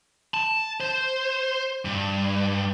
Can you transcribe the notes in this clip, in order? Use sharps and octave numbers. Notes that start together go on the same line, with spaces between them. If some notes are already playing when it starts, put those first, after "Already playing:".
A5
C5
G2